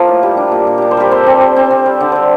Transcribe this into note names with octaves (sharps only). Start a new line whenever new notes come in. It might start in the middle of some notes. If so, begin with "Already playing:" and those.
Already playing: F3 A#3 F4 A4 D#5
A2
G3 G4
D4
A#2
A#2
D4 G4
C5
G3 G4 A#4
C4 A4 C5
C4
G3
C4
C4
G3
D3 D5
G3 C5